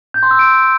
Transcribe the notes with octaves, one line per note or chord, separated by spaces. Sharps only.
G6
C6
E6
D7